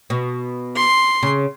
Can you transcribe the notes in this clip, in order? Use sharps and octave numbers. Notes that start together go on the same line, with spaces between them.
B2
C6
C#3